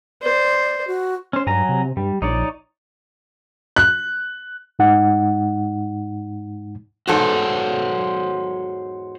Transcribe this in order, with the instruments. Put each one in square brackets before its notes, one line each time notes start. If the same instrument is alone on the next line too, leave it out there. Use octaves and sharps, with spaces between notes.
[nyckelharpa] C5 [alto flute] D5
[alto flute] F#4
[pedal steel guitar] C#4 C5
[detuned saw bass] G2 [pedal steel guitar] F#3 G#5 A#5
[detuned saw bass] C3
[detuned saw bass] G2 [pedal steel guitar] G3
[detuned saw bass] A#1 [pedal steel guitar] D#4 C#5 D5
[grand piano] F#6
[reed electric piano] G#2 G#3 D#4 F#5
[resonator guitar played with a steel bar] E2 G#2 A4 [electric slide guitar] F#4 C5 C#5